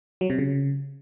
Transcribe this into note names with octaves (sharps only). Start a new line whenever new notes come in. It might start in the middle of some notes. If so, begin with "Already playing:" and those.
F#3
C3
C#3